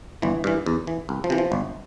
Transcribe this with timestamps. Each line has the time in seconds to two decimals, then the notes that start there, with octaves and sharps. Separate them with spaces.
0.22 G1 E3
0.44 G2 E3
0.66 E2
0.87 E3
1.09 C2
1.24 F3
1.30 C3 E3
1.38 F3
1.52 G1